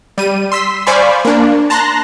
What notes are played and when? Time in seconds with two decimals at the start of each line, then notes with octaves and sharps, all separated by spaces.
0.18 G3 D#7
0.52 C6 E6 B6
0.87 C5 D5 F5 G#5 B5 C#6
1.25 A#3 D4
1.70 A5 A#5 C6 F#6 A#6